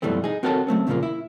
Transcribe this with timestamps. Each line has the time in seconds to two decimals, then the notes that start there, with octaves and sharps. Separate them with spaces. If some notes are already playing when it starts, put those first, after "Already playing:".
0.02 F#2 B2 E3 G3 A3 C4
0.24 D#4 G#4
0.43 C4 F#4 A4 A#4 C#5 A5
0.67 F#3 A3 C4 C#4
0.87 E2 A#2 C#3 E3 F3 A#3
1.03 E4